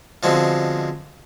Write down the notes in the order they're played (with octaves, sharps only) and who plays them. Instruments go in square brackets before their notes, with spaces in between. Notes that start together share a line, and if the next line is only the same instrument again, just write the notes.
[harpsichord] B2 D3 F3 G#3 C4